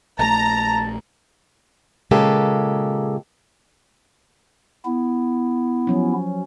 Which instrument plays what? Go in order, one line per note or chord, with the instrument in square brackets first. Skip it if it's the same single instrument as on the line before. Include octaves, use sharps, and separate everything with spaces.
[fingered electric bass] A#1 A3 [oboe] A5 [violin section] A#5
[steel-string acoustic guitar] A#2 C#3 G#3 A#3 G4 A4
[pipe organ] B3 E4
[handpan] F3 F#3 C#4